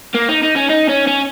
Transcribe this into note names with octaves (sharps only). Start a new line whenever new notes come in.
A#3
D#4
D#4
C#4
D#4
C#4
C#4